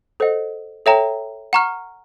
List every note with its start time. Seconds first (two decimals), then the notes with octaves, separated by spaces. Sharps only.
0.20 A4 C5 D#5 F#5
0.86 A4 C#5 E5 G5 A#5
1.53 F#5 A#5 C#6 F6